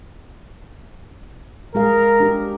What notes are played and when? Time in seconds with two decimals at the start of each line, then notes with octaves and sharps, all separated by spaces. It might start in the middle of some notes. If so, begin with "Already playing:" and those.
1.75 G#3 G#4 A#4 F5
2.20 D4 G4